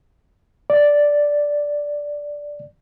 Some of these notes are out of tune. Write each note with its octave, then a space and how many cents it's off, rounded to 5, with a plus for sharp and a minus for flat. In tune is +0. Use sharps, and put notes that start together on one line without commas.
D5 -5